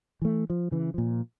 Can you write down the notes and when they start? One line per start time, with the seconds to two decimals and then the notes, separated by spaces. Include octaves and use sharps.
0.22 E3 A3
0.50 F3
0.71 C#3 E3
0.94 A#2 F3